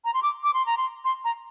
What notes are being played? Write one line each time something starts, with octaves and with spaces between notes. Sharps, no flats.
A#5
C6
D6
D6
C6
A#5
C6
C6
A#5